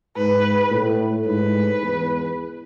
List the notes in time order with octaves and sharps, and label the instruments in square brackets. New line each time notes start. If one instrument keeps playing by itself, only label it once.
[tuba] G#2 [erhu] B4
[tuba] A2
[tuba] G#2 [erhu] B4
[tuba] E2